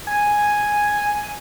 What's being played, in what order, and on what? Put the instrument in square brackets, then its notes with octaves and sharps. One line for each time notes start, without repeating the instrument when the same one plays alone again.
[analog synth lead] G#5